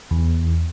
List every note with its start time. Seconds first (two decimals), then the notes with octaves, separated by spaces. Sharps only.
0.11 E2